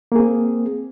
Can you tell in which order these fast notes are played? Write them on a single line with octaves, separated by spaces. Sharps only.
A#3 G#4 C4